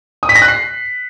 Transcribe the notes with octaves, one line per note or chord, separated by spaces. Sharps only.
D#6
B6
A#6
F#6
C7